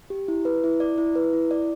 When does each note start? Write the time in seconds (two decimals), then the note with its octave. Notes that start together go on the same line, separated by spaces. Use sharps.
0.10 G4
0.28 E4
0.45 B4
0.64 E4
0.80 D5
0.98 E4
1.15 B4
1.33 E4
1.51 D5